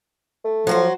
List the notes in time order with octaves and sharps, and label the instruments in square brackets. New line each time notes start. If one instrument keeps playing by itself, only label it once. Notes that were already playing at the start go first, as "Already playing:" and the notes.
[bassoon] A3
[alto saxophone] F3 [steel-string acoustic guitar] F#3 F#4 C5